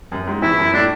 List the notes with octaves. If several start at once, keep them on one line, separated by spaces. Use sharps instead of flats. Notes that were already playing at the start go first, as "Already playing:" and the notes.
F#2
G#2
E2 E4
F#2
A2 D4